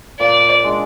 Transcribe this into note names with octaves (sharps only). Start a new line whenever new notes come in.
A#2 D5
G#3 D4